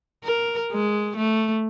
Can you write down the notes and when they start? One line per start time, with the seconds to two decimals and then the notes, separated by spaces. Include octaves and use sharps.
0.24 A#4
0.73 G#3
1.17 A3